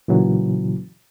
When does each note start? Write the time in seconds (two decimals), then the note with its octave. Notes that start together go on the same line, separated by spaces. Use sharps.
0.08 A#2 C#3 E3 F#3